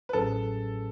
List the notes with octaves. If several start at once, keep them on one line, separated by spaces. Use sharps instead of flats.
B4
A1 A2 F#3 C#4 G#4 A4